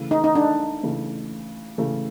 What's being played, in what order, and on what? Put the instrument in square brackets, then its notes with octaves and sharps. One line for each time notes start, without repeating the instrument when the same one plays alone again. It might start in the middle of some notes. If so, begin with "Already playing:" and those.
Already playing: [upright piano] C#3 E3 A3
[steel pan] D#4
D#4
D4
[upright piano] C#3 E3 A3
C#3 E3 A3